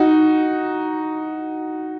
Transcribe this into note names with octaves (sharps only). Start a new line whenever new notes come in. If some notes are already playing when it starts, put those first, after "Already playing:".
Already playing: D#4 F#4